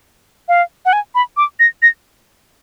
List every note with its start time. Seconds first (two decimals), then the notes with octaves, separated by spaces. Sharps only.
0.48 F5
0.86 F#5
0.93 G#5
1.15 B5
1.37 D6
1.60 A#6
1.82 A#6